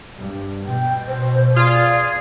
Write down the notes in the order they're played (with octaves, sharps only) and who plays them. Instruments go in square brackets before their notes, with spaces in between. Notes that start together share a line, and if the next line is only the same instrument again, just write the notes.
[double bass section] G2
[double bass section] B2 [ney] G5
[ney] C5
[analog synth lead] F4 [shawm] G#4 [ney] D5